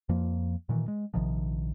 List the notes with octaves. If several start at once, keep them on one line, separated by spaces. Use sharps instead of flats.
F2 F3 A#3
A#2 D#3 E3
G#3
A#1 C3 D#3 F3